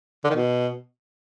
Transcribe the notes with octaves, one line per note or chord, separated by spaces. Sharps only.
D3
D#3
B2